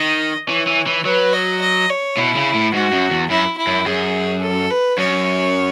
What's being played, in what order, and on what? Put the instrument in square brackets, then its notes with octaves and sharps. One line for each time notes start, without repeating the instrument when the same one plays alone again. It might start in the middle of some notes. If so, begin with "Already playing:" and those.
Already playing: [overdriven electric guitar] D#3 [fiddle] D#5
[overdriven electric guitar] E3 [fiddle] C#5
[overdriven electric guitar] E3
E3
[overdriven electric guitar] F#3 [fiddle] B4
[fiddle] D#5
D#5
C#5
[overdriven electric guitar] B2 [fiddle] E4
[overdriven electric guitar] C#3
A2
[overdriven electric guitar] G#2 [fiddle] F#4
[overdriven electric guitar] F#2
E2
[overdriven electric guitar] F#2 [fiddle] E4
[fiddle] E4
[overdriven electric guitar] F#2
[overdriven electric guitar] F#2 [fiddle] G#4
[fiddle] A4
B4
[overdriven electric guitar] F#2 [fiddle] C#5